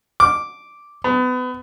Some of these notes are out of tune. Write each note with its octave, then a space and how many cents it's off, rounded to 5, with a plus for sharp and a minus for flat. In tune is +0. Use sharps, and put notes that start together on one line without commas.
D6 -5
B3 +30